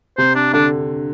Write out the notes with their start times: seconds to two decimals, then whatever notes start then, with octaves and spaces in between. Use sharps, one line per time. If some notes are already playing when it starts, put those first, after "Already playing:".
0.18 C3 C5
0.36 D4
0.53 D3 D4